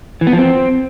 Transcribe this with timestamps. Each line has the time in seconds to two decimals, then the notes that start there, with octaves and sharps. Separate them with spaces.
0.21 E3
0.27 B3
0.33 F3
0.38 C4